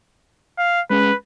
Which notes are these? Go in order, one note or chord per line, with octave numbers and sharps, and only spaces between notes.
F5
G#3 C#4 G#4 B4